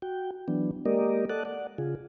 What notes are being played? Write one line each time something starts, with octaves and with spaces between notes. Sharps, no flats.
F#4 G5
E3 F#3 B3 D4
G#3 A#3 G4 A#4 D5 D#5
A4 D5 D#5 F#5 A5 F#6
D5 F#5
C#3 F4 G#4